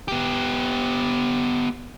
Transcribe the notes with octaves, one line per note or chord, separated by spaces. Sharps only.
B3 G4